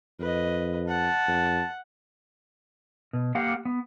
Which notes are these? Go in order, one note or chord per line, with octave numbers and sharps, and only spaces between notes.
F2 B4 D#5
F#5 A5
F2
B2
A#3 G4 F5 F#5
B3